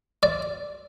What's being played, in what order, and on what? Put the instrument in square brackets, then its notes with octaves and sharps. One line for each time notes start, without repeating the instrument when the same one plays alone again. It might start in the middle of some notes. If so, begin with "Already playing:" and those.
[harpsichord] D5